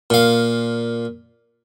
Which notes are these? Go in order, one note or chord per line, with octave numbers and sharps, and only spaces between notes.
A#2 F5